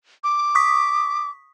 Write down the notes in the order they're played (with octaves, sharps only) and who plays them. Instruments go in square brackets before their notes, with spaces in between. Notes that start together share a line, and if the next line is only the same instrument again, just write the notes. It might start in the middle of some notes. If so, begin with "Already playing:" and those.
[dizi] D6
[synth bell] C#6 D#6 B6